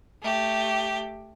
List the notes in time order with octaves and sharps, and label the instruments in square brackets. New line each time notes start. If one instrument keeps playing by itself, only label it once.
[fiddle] A3 G4